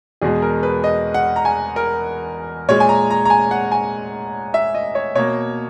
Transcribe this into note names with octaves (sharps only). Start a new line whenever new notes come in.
E2 B2 G#3 G#4
A#4
B4
D#5
F#5
A#5
G#5
A#4
A#2 G#3 C#5
G#5
A#5
A#5
A#5
G#5
F#5
G#5
E5
D#5
C#5
B2 A#3 C#5